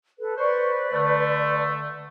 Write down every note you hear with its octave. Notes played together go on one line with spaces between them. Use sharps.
A4 B4
B4 C5 D5 C#6
D3 A3